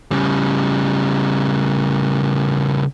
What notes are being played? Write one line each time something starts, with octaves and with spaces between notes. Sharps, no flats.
C#3 G3